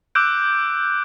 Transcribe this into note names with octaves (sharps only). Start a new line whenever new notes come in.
D6 E6 F#6 G6 D7